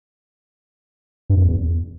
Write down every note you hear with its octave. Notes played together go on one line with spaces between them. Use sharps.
G2
F#2
E2